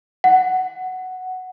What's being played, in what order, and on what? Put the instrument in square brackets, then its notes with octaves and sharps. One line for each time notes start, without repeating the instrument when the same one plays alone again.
[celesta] F#5